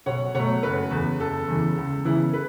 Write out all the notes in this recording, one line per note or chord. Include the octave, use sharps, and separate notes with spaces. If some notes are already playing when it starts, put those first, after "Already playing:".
B1 C#5 F#5
B2 F#3 A3 C#5 F#5
F#1 B4
E2 C#3
F#1 A4
E2 C#3 E3
C#2
C#3 E3 B3 E4
B4